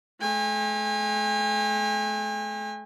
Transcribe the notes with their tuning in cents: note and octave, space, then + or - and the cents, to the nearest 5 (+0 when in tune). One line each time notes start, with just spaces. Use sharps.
A3 -45 G#5 -40